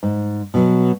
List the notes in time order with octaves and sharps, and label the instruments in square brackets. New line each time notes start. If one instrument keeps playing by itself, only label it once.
[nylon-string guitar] G#2
B2 F#3